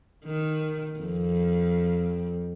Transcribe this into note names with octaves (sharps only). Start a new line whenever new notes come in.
D#3
F2